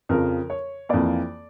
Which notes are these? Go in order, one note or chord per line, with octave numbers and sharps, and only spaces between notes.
F2 C#3 F3 A#4
C#5
F2 E3 A#3 D5